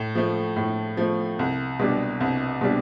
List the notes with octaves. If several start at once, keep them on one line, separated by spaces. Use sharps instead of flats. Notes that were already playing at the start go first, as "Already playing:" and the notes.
Already playing: A2
F3 A3
A2
F3 A3
C2
B2 G3 D4
C2
B2 G3 D4